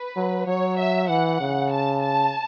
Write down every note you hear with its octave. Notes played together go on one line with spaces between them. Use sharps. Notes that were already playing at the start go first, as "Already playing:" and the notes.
Already playing: B4
F#3
F#3 C#5
E5
E3 F#5
C#3
A5
A5